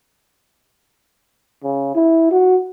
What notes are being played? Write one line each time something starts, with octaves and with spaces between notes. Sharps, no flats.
C#3
E4
F#4